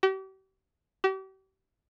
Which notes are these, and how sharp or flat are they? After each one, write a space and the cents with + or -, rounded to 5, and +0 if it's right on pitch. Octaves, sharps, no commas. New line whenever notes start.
G4 -40
G4 -40